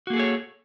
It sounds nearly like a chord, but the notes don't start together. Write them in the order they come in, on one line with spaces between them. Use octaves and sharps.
F#4 A#3 G#4 A4 C#5